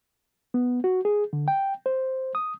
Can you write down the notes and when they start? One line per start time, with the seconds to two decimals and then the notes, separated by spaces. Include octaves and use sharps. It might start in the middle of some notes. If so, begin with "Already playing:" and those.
0.54 B3
0.84 F#4
1.05 G#4
1.33 D3
1.48 G5
1.86 C5
2.35 D#6